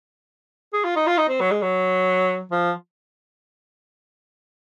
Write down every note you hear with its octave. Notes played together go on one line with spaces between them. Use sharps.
G#4
F4
D#4
F4
D#4
C4
F#3
G#3
F#3
F3